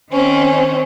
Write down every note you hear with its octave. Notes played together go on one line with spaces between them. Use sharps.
D#3 C4 C#4